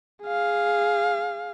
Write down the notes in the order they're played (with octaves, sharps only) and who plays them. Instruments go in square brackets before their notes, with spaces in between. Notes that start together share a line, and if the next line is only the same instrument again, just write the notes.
[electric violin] G#4 F5